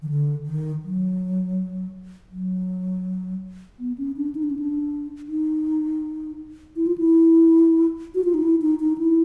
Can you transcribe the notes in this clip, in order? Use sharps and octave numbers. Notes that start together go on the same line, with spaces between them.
D#3
D3
D#3
F#3
F#3
B3
C#4
D4
D#4
D4
C#4
D4
D#4
E4
F4
E4
F#4
F4
D#4
E4
D#4
D#4
E4